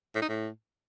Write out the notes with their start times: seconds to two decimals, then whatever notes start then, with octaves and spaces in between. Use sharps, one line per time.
0.15 A2
0.22 D#4
0.29 A2